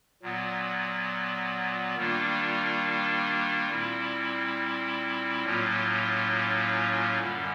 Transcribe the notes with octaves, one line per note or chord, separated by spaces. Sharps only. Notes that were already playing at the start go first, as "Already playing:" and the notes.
A#2 F#3 B3
D#3 G3 A#3 D4 F4
A#2 G3 C4 E4
A2 F#3 A#3 C#4 F4
F#2 D3 G3